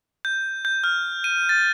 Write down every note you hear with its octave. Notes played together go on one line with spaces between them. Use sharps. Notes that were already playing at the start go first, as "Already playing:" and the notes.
G6
G6
F6
D#7
A6